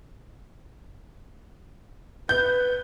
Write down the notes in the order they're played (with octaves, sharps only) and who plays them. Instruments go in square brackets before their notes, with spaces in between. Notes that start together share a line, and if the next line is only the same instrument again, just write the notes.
[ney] B4 [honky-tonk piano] G6